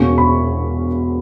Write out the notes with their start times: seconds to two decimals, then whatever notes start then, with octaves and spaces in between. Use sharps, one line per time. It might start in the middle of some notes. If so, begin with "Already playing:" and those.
Already playing: E1 E2 B2 A#3 C#4 C#6
0.18 B5